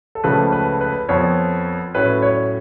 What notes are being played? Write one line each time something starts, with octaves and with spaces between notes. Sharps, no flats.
A4
C#2 C#3 F3 A3 B4
B4
B4
F2 F3 B3 C#5
A2 F#3 C#4 B4
C#5